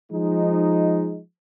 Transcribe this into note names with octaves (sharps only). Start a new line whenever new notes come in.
F3 G#3 D#4